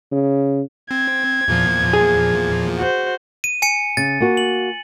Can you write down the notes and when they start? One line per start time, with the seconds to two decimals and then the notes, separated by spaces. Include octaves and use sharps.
0.12 C#3
0.91 C4 G#6
1.48 E2 A#2 F3
1.93 G#4
2.78 F#4 C5
3.44 D#7
3.62 G#5 C#7 D#7
3.97 C#3 A6
4.20 A#3 F#4
4.37 F#7